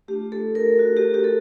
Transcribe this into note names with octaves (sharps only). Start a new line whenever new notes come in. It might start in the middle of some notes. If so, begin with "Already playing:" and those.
A3 D4 F4 G4
A4
A#4
F#4
G4
G4
A4